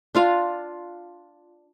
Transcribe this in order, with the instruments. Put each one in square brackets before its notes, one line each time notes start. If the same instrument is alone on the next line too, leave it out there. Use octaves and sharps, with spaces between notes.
[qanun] D4 F4 F5